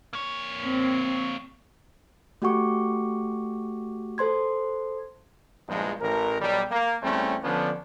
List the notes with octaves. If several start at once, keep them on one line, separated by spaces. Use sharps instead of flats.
A#3 C#5
C4
A3 F#4 G4 F#5 C#6 D6
A4 C5 C6 G#6
A#1 E2 G2 F3 G#3
A1 A#4
B1 G3
A#3
E2 G3 A3 C4 C#4
D3 F3 B3 C#4 D4